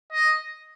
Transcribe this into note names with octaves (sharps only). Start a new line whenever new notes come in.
D#5